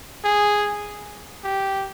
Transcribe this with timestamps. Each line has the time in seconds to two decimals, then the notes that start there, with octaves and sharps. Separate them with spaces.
0.24 G#4
1.44 G4